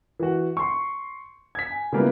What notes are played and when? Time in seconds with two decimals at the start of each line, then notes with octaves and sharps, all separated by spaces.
0.20 E3 F#4
0.57 C6 C#6
1.55 G#6 B6
1.71 G#5
1.93 C#3 G3 A#3 B3 E4 F4